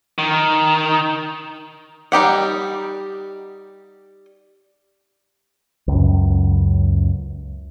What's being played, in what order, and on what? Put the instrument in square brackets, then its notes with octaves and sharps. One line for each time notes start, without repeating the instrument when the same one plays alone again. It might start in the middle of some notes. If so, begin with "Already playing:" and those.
[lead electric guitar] D#3
[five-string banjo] G3 D#4 G4 F#5
[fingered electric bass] C#2 F#2